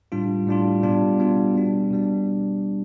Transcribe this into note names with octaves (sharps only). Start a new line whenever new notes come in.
A2 G3 D4 F4
A2 G3 D4 F4
B2 G3 B3 D4 F4
B2 G3 B3 D4 F4
B2 G3 D4
B2 G3 D4